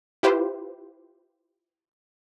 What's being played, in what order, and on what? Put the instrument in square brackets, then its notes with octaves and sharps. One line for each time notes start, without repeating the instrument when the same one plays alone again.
[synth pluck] E4 F4 G4 B4 C5